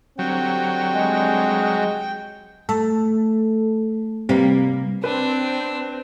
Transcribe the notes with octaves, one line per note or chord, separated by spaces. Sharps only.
D3 F#3 G3 C4 G5
G#3
A3 A4
C3 G3 A#3 B4
C4 D4 B4